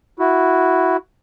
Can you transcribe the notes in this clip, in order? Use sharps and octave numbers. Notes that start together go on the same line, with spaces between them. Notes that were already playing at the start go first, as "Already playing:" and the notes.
E4 F#4